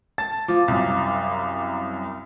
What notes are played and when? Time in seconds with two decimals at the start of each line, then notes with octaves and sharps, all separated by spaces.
0.18 A5 A6
0.48 F3 F5 D6
0.68 C2 F#2